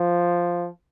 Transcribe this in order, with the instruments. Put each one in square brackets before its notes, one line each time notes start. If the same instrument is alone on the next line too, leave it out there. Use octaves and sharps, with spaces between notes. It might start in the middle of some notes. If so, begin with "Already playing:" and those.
Already playing: [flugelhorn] F3